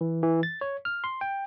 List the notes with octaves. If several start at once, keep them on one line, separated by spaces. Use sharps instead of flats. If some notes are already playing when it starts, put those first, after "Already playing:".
E3
E3
A6
C#5
F6
C6
G5